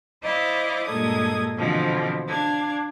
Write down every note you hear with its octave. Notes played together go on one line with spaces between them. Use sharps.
E4 C5 D5 D#5 F5
G2 A#2 G#3 A4 D#6 G#6
B2 D3 E3 F3 G#3 C4
D4 F5 G#6